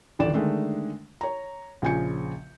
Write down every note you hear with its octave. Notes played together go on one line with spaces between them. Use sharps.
D#1 A1 D3 D5 E7
D3 D#3 G#3 A3 D4
C#5 A#5
A#1 C#3 F3 G#5 G6 C#7